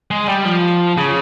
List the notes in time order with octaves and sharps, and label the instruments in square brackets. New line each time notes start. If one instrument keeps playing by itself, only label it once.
[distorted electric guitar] G#3
G3
F3
C#3